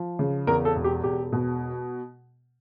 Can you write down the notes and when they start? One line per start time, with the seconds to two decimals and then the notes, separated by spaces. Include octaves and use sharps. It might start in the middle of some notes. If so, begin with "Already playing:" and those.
Already playing: F3
0.19 C#3
0.47 E2 A#4
0.65 A4
0.76 E1
0.84 G4
1.03 E1 G4
1.33 B2